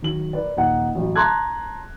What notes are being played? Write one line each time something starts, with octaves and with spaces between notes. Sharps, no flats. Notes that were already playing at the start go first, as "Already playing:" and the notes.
D#3 F#3 F#7
A#4 B4 D5
D#1 D#4 F#5
A1 F#3
A5 A#5 C6 D6 F#6 G#6